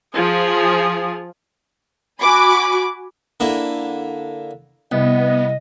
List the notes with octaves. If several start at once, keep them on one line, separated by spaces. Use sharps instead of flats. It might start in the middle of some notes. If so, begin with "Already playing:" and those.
F3 G#4
F#4 G#5 B5 D6
D3 A#3 E4
C2 B3 D#5